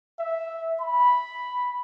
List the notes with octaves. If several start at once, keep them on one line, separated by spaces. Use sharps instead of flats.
E5
B5